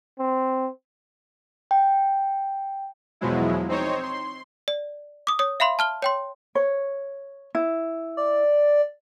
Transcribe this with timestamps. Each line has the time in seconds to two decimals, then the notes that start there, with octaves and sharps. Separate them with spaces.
0.19 C4
1.71 G5
3.21 E2 B2 F3 F#3 G#3 E4
3.69 C4 D#4 C5 C#5
4.03 C6
4.68 D5
5.27 D6 D#6
5.39 C#5 D#6
5.60 E5 F5 B5 C6
5.79 A5 F6 G7
6.02 C#5 G5 C6
6.55 C#5
7.55 E4
8.17 D5